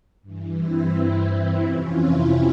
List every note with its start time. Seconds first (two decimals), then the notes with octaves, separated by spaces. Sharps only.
0.22 G2 E3
0.57 C4 E4
0.92 G2 E3
1.62 F2 C3 E3 C#4 F4
1.97 C4 E4